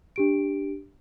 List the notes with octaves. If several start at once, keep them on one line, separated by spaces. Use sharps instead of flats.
D4 G4 D7